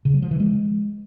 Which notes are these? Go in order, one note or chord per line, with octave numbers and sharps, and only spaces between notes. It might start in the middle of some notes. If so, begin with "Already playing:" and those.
C#3
F#3
F3
E3
G#3